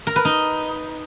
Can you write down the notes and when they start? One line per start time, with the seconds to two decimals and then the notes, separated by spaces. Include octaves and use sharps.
0.07 A#4
0.16 B4
0.25 D#4